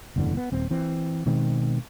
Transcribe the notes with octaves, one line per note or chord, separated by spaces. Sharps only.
F#1 E2 A2 D3
B3
D#1 C4
E3 C4
B2 D#3 G#3 C4